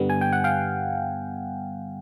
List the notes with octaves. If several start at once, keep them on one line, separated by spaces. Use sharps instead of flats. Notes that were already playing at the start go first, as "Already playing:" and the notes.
Already playing: G2 D3 G3 B3
G#5
G5
F#5
F5 G5